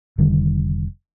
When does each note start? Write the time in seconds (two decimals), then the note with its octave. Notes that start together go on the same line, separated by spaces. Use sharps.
0.18 F1 D3 D#3 G3